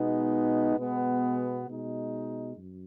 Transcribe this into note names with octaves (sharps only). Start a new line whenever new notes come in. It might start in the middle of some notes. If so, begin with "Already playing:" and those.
Already playing: B2 G#3 B3 D#4
B2 G#3 B3
B2 G#3 D#4
F#2